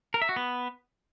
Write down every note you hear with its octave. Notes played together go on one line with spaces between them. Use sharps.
A#4
E5
F#4
B3